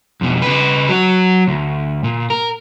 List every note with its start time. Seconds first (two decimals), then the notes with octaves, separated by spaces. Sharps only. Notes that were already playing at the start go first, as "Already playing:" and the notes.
0.21 F2 B2
0.42 C#3 B4
0.89 F#3 F#4
1.48 D2
2.04 A#2
2.30 A#4